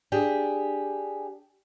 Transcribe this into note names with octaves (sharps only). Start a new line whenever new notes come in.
D4 G4 G#4